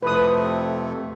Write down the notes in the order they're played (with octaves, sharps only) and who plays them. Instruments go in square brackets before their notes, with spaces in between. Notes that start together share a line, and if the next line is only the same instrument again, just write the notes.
[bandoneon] F2 C3 A3 [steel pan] B4 D#6